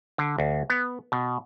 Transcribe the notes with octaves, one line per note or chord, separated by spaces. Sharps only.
D3
D2
B3
B2